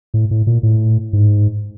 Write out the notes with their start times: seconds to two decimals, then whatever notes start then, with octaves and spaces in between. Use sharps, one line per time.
0.14 A2
0.31 A2
0.47 A#2
0.63 A2
1.13 G#2